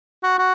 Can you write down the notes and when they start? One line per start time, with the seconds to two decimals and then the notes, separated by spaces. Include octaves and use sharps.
0.23 F#4
0.39 F#4